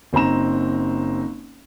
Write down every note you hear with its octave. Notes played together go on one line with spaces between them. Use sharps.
F#1 C4 D#4 A#5 E7